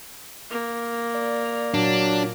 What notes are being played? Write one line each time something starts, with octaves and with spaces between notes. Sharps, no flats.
A#3
D5
A#2 F#3 D4